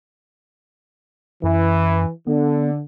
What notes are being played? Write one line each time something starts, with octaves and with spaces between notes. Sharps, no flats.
F#2 E3
D3 B3